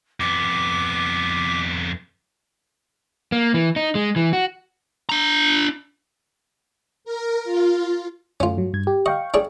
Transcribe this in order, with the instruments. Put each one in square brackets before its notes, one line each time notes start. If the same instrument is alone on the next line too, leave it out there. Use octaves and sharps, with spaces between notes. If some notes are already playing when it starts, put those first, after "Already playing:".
[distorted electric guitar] F2 B3 [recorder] D6
[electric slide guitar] A#3
E3
D#4
G#3
E3
F#4
[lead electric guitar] D4 A#5
[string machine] A#4
F4
[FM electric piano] F#2 A3 [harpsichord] C#4 F4
[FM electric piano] G2 F#3
G2 G#6
G4
[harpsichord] D#5 [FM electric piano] F5 G5 C#6
[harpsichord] D4 G#4 C#5